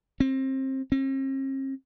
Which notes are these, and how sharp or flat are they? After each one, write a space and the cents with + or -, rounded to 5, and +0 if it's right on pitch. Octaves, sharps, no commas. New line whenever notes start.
C4 +25
C4 +45